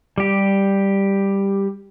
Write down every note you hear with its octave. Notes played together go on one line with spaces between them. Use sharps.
G3 G4